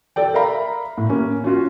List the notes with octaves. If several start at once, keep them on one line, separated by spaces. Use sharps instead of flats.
A4 D5 G5
A#4 D5 E5 F5 A#5 B5
A2
A#3 C#4
C#4 F4 F#4